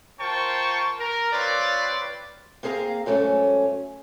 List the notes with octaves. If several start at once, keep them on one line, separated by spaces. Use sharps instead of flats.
F4 A#4 C5 G5 A5 C#6
A#4
C4 F4 B4 C#5 D5 F5
A#3 C4 G#4 F5 A#5
G#2 F#3 A3 C#4